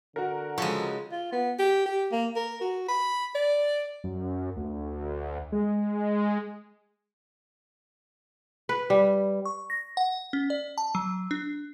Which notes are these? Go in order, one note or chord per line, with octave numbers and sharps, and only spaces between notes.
D3 F#4 A#4
C#3 F3 G#3 A4 C#6
F4
B3
G4
G4
A#3
A#4
F#4
B5
D5
F#2
D2
G#3
B4
G3
C#6
A#6
F#5
C#4
D5
A5
F#3
D4